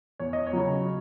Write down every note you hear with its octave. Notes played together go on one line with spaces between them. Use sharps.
E2 C#5
D#5
C#5
C#3 F#3